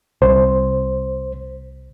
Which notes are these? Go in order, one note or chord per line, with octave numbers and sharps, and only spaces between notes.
C2 C5